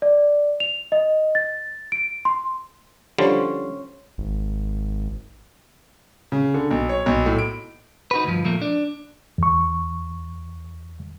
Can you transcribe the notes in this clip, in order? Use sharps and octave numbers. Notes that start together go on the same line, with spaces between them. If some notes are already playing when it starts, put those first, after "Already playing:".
D5
F7
D#5
A6
D7
C6
D3 F3 G3 C#4 C5 C#5
G#1
C#3
D3
B1
C#5
B1
A2
D7
D#4 F#4 B4
D2 G2 F3
A#2 F3 A3 A#3
D4
E2 C#6